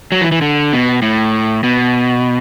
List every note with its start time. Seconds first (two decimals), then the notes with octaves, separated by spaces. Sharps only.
0.12 F#3
0.21 E3
0.32 E3
0.41 D3
0.73 B2
1.02 A2
1.63 B2